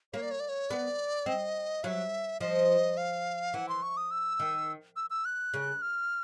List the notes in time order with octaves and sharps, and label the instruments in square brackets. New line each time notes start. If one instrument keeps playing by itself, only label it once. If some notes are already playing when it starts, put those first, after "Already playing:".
[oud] A#3 [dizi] C#5
[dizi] D5
C#5
D5
C#5
[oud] B3 [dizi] D5
[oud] C4 [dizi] D#5
[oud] F#3 [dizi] E5 F5
[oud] F3 [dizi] D#5
[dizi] F5
[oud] E3 [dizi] F#5
[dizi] C6
C#6
D#6
E6
[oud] D#3
[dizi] E6
E6
F#6
[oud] C#3
[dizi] F6